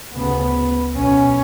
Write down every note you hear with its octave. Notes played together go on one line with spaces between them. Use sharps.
D2 C#3 B3
B1 B2 C#4